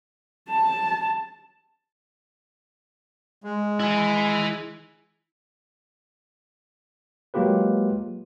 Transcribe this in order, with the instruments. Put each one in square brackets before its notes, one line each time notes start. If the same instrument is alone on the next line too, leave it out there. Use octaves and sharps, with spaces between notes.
[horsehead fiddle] A5
[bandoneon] G#3
[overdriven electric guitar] E4 G#5
[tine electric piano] F#3 G#3 A#3 F4 G4 B4